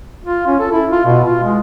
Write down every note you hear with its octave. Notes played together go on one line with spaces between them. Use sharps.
F4
C#4
A4
E4
F4
B2
F4
G#3